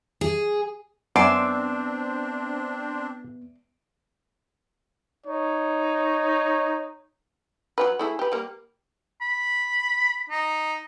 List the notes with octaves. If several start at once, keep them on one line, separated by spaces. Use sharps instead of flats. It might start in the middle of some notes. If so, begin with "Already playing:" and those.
G#4
F#2 B3 C4 D4 D5 E5 C6
D#4 C#5
F#3 G#3 B4
A3 E4 G#4
G4 B4
G3 A#3
B5
D#4